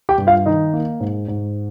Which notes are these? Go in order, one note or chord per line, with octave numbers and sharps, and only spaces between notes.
G4 G5
G2
F4 F5
D#3 D#4 D#5
A#3
G#2
G#2